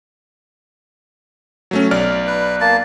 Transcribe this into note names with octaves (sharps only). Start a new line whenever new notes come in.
F#3 A3 C#4
B1 D5 F6
B4
A#3 A5